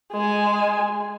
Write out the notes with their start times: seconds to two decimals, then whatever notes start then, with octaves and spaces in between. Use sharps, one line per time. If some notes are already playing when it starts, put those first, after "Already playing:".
0.13 G#3 G#5